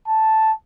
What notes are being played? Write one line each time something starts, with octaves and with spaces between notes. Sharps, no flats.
A5